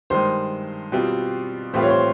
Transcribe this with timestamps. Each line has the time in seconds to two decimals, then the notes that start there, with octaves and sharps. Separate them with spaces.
0.10 G2 D#3 G#3 C5
0.92 B2 G3 C4 F4
1.73 A2 E3 G3 C4 F4 C5
1.82 C#5
1.90 C5